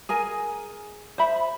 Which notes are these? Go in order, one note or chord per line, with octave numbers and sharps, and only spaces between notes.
G#4 A#4 G#5
C5 E5 B5